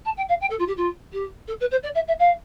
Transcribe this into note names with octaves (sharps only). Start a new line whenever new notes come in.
A5
G5
F5
G5
A4
F4
G4
F4
G4
A4
B4
C5
D5
E5
E5
F5